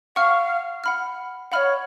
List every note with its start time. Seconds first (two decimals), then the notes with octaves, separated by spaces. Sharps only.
0.16 F5 F#5 C#6 F6
0.84 F#5 B5 F6
1.52 C#5 F5 F#5 B5 F6